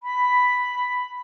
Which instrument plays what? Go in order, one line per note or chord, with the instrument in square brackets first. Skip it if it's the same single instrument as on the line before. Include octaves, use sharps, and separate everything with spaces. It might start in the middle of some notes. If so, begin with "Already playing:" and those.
[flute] B5